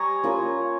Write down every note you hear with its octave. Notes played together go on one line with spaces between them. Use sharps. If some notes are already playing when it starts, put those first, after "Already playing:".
Already playing: G3 G#5 A#5 C#6 D#6
A#3 C#4 F4